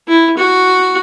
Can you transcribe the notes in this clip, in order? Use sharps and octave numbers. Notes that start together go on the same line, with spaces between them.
E4
F#4